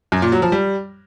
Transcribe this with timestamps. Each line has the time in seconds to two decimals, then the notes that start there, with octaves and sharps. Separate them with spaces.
0.12 F#2
0.22 A#2
0.32 F#3
0.42 F3
0.52 G3